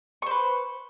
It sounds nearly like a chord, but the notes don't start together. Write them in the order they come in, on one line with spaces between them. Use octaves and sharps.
C#6 C5 B4